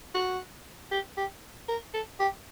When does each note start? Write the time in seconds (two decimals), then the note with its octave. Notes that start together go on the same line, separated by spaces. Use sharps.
0.15 F#4
0.91 G4
1.17 G4
1.68 A#4
1.94 A4
2.20 G4